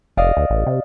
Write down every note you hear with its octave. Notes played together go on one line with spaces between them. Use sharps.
F1 D5 D#5 F5
D2
A1
C3